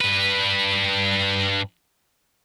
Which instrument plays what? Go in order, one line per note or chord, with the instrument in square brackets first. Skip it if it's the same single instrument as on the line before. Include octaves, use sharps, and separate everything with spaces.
[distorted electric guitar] G2 B4